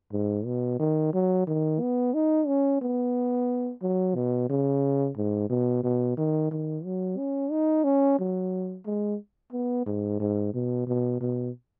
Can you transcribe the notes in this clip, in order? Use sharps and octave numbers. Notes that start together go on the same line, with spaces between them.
G#2
B2
D#3
F#3
D#3
B3
D#4
C#4
B3
F#3
B2
C#3
G#2
B2
B2
D#3
D#3
F#3
C#4
D#4
C#4
F#3
G#3
B3
G#2
G#2
B2
B2
B2